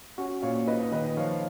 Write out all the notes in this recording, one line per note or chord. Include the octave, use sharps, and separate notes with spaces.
C#4 F#4
A#2 C#5 F5
D#4 B4 D#5
D#3 B4 D#5
F3 C#5 F5